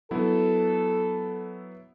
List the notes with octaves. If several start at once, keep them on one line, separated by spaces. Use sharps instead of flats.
F#3 B3 E4 A4